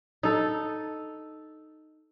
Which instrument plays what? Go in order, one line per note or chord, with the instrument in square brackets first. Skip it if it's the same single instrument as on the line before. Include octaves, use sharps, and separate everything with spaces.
[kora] D#4 A4